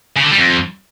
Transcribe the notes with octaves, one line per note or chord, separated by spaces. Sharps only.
C#3
D3
G3
F2